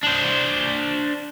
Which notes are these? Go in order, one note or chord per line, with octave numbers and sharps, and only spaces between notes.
D4 C5